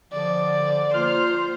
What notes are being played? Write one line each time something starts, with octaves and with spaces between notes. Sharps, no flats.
D3 F3 D5
A#3 F4 C5 F6